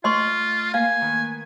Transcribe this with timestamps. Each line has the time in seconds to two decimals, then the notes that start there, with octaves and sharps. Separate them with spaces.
0.04 A3 F4 D#5 C6 C#6
0.74 A#3 F5 G#5
1.01 D#3 B4